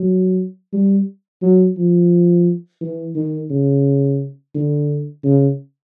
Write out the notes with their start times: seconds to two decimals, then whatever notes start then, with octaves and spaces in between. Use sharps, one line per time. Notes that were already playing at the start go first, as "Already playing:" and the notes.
Already playing: F#3
0.73 G3
1.42 F#3
1.77 F3
2.81 E3
3.16 D#3
3.51 C#3
4.55 D3
5.24 C#3